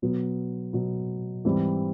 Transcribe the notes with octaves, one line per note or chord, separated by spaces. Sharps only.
B2 F#3 B3
B2 F#3 B3
G#2 E3 G3 C4 E4